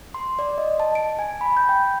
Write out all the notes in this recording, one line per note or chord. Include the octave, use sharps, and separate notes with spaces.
C6
D5
D#5
A5
D7
G#5
B5
G6
G5